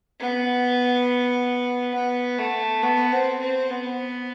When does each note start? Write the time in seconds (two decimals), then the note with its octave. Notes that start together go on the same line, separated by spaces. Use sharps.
0.20 B3
1.94 B3
2.38 A3
2.83 B3
3.12 C4
3.41 C4
3.70 B3